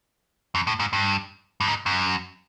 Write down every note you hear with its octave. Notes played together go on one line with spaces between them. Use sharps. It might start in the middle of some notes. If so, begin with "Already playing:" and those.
F2
A2
G#2
G2
G2
G#2
F#2